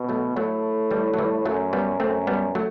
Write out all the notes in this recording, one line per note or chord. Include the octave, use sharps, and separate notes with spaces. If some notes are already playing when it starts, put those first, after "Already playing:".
Already playing: B2
F#3 A3
A2 F#3 A3
E3 G3
F#3
E3 G3
F#2 F#3 A3
G3 B3
F#2 A3 C4
G3 B3
F#3 A3